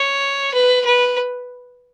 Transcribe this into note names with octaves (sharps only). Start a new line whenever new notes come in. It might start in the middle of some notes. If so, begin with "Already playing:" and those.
Already playing: C#5
B4
B4